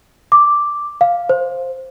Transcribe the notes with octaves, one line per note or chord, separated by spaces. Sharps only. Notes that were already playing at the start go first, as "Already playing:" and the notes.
D6
F5
C5